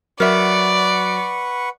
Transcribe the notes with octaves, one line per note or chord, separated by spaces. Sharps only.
F#3 A#4 B4 D5 E5 F#5 C#6